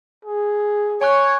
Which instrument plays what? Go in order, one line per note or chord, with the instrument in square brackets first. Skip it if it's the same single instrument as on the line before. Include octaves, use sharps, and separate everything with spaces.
[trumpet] G#4
[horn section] C#5 [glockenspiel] G#5 C#6 F#6